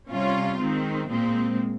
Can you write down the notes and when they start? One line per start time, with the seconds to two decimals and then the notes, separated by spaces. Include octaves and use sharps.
0.09 C3 G3 C#4 F4
0.58 D#3 G#3 C4
1.07 A#2 G#3 C4